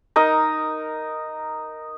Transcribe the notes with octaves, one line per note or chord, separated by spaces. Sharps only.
D#4 A#4 D#5